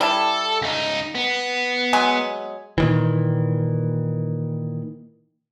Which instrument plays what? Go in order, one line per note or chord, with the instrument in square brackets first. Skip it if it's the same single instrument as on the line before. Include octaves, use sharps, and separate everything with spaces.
[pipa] G3 E4 A5 [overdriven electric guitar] A4
[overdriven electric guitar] C#2 D#4
B3
[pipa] F#3 G#3 G#4
[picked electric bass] A#2 D#3 E3